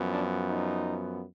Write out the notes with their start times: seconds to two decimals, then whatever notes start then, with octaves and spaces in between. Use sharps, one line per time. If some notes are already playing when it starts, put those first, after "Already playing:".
Already playing: F#2 F3 B3
0.13 D4
0.50 D#4